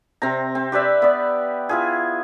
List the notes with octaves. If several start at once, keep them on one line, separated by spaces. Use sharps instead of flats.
C3 C4 A#5
C4
G4 B4 D5 E5
B3 D5
E4 F4 G#4